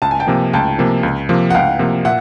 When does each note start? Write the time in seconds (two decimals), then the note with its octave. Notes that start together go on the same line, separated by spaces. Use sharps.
0.02 C#2 A5
0.11 G#5
0.20 G5 A5
0.27 C3 F3 A#3
0.53 C#2 G5 A5
0.78 C3 F3 A#3
1.03 C#2
1.29 C3 F3 A#3
1.50 F#5
1.55 C#2 F5 G5
1.79 C3 F3 A#3
2.05 A#2 E5 F#5